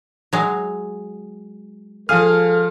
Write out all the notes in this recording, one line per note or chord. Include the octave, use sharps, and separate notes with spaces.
F#3 G#3
F3 G#4 A4 F5 F6